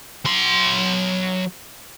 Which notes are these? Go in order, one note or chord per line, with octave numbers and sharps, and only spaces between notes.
F#3 C6